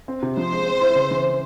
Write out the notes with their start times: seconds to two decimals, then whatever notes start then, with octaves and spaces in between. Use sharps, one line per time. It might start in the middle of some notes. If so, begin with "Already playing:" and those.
0.08 C4
0.23 C3
0.37 F3 C5
0.52 G#3
0.67 C4
0.81 E4
0.95 C#3
1.11 E3